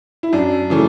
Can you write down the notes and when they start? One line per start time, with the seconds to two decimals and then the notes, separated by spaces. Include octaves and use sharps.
0.23 E4
0.33 F#2 D4
0.70 C#3 E3 A3